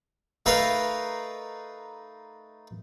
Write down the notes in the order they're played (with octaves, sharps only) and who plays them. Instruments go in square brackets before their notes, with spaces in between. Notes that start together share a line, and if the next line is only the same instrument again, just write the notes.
[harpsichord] A3 D#4 A#4 B4 F5